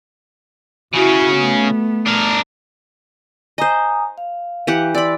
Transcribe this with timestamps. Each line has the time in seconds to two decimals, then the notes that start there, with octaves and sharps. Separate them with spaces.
0.94 C#3 C#4 E4 F#4
1.36 A3 B3
2.06 D4 A#4
3.58 C5 D#5 G#5 A#5 D#6
4.18 F5
4.67 E3 G4 F#5
4.95 D5 B5 C6 E6